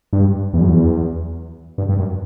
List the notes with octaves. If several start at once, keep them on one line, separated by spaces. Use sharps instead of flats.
G2
E2
F#2
E2
G2
G2
F#2